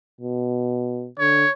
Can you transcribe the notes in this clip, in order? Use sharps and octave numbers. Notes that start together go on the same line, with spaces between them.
B2
D3 C#5